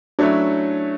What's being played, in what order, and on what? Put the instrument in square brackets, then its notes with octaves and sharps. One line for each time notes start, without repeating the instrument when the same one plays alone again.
[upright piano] F#3 A3 C#4 E4 [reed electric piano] D4